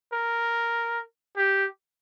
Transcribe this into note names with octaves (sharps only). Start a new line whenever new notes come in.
A#4
G4